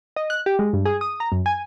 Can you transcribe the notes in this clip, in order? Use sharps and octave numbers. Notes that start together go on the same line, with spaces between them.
D#5
F#6
G4
G#3
G2
G#4
D#6
A#5
F#2
G#5